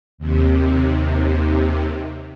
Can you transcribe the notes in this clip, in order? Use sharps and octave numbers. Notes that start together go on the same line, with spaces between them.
D#2 C3